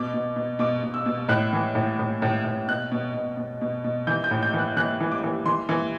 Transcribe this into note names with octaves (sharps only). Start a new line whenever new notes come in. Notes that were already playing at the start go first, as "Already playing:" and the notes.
Already playing: B2 D6
B2
B2
B2 D6
B2
E6
B2
A2 F#6
E3
A2
A2
A2
A2
B2 F#6
B2
B2
B2
B2
B2
E3 G6
G6
A2
G6
E3
F#6
E3 F#6
E3
D6
E3
E3 C6
E3